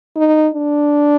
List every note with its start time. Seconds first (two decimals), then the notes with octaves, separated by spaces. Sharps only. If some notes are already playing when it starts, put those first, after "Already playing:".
0.16 D#4
0.54 D4